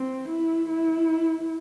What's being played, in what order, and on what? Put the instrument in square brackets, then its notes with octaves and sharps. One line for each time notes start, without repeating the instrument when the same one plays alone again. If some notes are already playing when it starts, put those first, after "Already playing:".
Already playing: [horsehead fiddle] C4
E4
E4